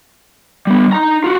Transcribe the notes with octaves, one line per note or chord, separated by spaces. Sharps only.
G3 B3
D#4 A#5
F4 F#4